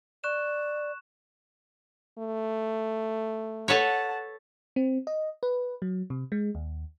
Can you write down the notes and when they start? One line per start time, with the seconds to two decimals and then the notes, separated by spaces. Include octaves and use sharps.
0.24 D5 C#6 F#6 E7
2.18 A3
3.68 A4 B4 C#5 F#5 A5
4.76 C4
5.07 D#5
5.43 B4
5.82 F#3
6.10 C3
6.32 G#3
6.55 D#2